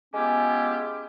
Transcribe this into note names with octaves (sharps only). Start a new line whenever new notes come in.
G#3 B3 C#4 E4 F4 G4